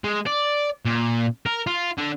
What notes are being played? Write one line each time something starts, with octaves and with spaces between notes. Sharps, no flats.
G#3
D5
A#2
A#4
F4
D3